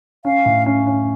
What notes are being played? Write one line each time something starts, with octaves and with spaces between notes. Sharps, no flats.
C#4 F5
A2
C#4
C#4